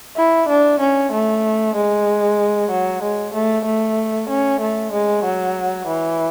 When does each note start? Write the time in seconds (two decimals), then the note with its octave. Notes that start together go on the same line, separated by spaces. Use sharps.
0.17 E4
0.49 D4
0.80 C#4
1.12 A3
1.76 G#3
2.70 F#3
3.03 G#3
3.34 A3
3.65 A3
4.29 C#4
4.61 A3
4.93 G#3
5.24 F#3
5.88 E3